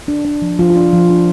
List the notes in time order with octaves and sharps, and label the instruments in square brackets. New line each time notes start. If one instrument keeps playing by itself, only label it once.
[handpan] D4
D4
F3
F3 F4
F4
D4
F4
F3
D4